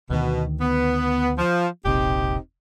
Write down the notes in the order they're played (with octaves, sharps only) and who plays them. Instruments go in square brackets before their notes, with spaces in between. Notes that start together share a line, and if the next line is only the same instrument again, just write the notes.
[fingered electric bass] D2 D#3 [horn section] B2
[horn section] B3
F3
[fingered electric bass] E1 A#1 C3 [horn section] C4 D#4 G4